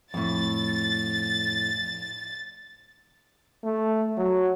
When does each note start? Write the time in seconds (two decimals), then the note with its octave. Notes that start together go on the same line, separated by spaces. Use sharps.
0.14 F2 A2 A6
3.64 A3
4.17 F#3